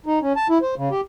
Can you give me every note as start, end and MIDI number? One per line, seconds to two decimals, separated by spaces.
0.06 0.19 63
0.22 0.33 61
0.36 0.47 81
0.49 0.58 64
0.62 0.75 72
0.77 0.89 49
0.91 1.01 67